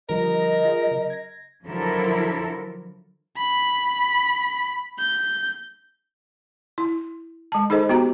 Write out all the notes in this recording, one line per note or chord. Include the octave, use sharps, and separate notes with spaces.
D3 F3 G3 A#4 D#5
F4 G#4
C#3 F#3
G#6 A#6
D3 F3 F#3 E4 A4 A#4
B5
G6
E4
G#3 A5
D#4 G#4 A4 C5 D#5
B3 F#4 G4 A#5